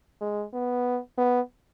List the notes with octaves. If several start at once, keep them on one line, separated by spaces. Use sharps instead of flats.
G#3
B3
B3